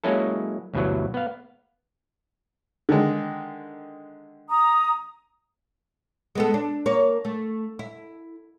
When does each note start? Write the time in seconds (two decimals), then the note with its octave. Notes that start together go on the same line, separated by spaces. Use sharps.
0.04 F#3 G#3 A#3 C#4 E4 A4
0.74 D2 G2 B2 E3 F#3
1.14 B3 F5
2.89 D3 D#3 G#3
4.50 A#5 D#6
6.35 G#3 B3 A4
6.54 D4
6.86 A#3 C#5
7.25 A3
7.79 E4